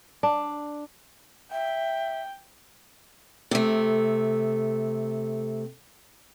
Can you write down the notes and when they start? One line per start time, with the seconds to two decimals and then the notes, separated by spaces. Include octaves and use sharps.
0.23 D4
1.52 E5 G5
3.51 C3 A3